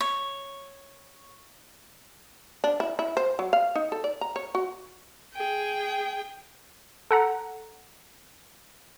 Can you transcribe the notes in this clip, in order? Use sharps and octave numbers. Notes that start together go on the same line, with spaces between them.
C#5
D4
E4
E4
C5
F#3
F5
D#4
A4
D5
A#5
C#5
F#4
G#4 G5
A4 F#5 A#5